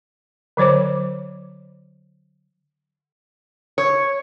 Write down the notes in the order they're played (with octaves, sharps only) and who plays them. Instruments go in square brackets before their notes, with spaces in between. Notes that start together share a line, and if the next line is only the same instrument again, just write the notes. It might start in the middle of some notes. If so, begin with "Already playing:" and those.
[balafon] D3 F#3 C5 C#5 D6
[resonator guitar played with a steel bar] C#5